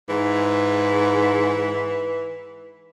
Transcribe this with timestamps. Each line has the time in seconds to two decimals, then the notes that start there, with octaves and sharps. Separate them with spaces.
0.09 G#2 E3